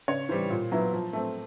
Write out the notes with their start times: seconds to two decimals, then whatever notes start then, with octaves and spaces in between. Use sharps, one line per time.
0.08 C#3 C#5
0.29 E3 G3 C5
0.50 A#2
0.72 F#3 B3 E4
0.93 F3
1.13 A3 C4